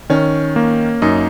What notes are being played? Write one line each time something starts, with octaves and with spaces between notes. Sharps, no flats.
D#3 C#4
A#3
F#2 D#4